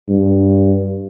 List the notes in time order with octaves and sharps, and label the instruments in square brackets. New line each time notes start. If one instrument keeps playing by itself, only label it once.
[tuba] G2